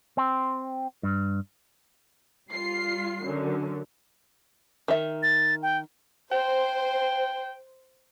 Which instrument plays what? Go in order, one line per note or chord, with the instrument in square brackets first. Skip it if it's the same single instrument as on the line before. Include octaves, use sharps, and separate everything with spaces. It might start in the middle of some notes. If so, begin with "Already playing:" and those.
[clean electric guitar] C4
G2
[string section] G3 F4 C7
F#2 D3
[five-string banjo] D#3 E5
[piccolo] A6
G5
[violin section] C5 [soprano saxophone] G5